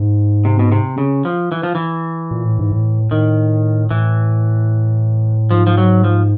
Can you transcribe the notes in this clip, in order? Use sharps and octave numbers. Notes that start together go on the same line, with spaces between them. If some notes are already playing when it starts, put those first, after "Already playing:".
Already playing: G#2
C3
B2
C3
C#3
F3
E3
F3
E3
A#2
A2
G#2
A2
A2 D#3
A2 E3
G#2 F3
F3
F#3
F3